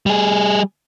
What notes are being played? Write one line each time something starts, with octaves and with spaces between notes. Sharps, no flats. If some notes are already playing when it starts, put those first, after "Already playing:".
G3 G#4